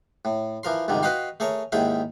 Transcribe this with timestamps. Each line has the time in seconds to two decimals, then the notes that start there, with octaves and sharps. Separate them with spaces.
0.25 A2
0.63 E3 F3 A#4 C6
0.88 C2 F2 G#2 D3 D#3
1.03 F#4 B4 D#5 F5 G5 C6
1.40 A3 G#4 A#4 C#5
1.72 D#2 G#2 D#3 E4 G#4 G5